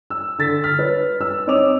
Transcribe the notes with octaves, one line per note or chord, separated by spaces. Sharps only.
E6
D3 A6 B6
F6 B6
B4 C#5
E6
C4 D#4 C#5 D6 D#6 F7